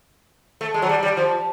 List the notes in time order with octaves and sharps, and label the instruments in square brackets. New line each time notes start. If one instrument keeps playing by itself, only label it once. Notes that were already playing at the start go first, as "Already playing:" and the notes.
[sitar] A3
G#3
F#3
G3
G3
F3